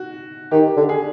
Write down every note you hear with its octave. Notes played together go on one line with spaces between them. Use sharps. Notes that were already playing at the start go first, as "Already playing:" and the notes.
Already playing: F#4
D#3 G4
D3
G#4